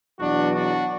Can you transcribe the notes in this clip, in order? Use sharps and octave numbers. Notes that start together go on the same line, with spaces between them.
E2 B2 F#3 D4 F#4
D4 F#4